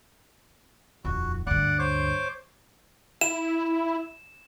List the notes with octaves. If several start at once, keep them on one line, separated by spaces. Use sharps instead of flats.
D#1 F2 F#4
D2 G2 D5 F#5
C5 C#5 D6
E4 E7